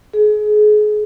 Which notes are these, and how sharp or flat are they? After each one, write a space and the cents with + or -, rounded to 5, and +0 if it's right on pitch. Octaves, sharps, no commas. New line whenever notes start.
G#4 +30